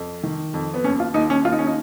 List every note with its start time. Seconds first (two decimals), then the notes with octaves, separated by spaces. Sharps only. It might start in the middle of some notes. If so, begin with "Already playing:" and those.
Already playing: F2
0.23 D#3
0.54 F2
0.74 B3
0.84 D#2 C#4
1.00 F4
1.14 D#2 D#4
1.30 C#4
1.44 D#2 F4
1.52 D#4
1.59 C#4
1.67 D#4